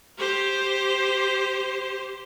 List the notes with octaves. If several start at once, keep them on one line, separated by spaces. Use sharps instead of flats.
G4 C5